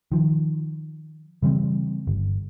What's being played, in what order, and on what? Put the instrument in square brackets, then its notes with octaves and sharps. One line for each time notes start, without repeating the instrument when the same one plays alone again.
[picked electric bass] D#3 F3
C#3 E3 G3 C4
G1